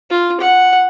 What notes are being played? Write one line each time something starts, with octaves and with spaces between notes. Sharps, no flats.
F4
F#5